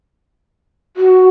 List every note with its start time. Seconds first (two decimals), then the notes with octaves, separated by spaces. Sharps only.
0.97 F#4